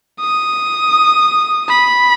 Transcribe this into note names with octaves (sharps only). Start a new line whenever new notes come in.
D#6
B5